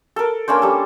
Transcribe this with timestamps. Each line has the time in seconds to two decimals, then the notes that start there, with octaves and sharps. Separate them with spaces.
0.16 A4 A#4
0.48 A#3 C#4 D4 C5
0.62 G3 A4